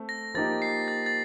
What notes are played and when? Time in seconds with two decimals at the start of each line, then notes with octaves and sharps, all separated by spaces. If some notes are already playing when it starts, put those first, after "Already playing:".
Already playing: A3 C4
0.09 A#6
0.34 F3 A#3 D#4 G4 A6
0.62 C7
0.88 A6
1.06 A6